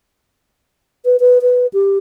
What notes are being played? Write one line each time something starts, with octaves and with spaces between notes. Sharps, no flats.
B4
B4
B4
G4